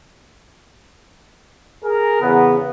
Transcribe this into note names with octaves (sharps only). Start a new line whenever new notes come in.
G#4 A#4
E2 C#3 B3